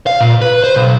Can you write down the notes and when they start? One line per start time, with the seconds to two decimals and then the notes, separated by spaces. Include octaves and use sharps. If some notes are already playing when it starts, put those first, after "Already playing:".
0.06 F5
0.20 A#2
0.42 B4
0.64 C5
0.76 B1